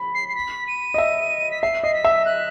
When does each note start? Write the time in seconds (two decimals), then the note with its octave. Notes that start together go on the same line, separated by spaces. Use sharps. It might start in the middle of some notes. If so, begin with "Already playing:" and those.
Already playing: B5
0.14 C7
0.28 C7
0.35 B6
0.68 D#7
0.94 D#5
0.98 E5
1.51 B6
1.62 E5 C7
1.83 D#5 C7
1.94 B6
2.05 E5
2.25 F#6